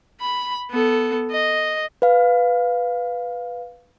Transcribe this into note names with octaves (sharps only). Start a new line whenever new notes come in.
B5
B3 A4
D#5
B4 F5